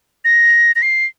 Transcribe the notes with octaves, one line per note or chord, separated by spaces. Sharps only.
A#6
A#6
C7